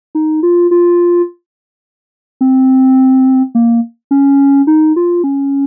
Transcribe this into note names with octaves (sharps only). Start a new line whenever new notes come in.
D#4
F4
F4
C4
A#3
C#4
D#4
F4
C#4